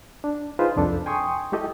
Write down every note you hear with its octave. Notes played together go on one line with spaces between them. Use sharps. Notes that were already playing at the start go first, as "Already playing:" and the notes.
D4
D#4 F4 G#4 B4 C5
C2 F2 D4 A4
G5 G#5 C6 C#6 D#6
G#3 E4 G4 A4 D#5